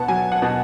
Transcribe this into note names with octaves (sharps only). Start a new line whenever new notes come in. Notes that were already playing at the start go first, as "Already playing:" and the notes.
Already playing: B2 B3 F#5 A5
F#3 G#5
F#5
B2